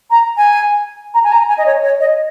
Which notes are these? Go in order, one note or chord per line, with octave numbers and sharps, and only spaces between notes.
A#5
G#5
A#5
G#5
A#5
G#5
D#5
C#5
C#5
D#5